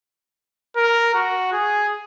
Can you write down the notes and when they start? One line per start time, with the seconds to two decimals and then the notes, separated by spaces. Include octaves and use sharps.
0.76 A#4
1.14 F#4
1.52 G#4